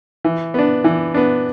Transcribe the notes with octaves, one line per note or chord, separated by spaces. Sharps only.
E3
B3 D4
E3
B3 D4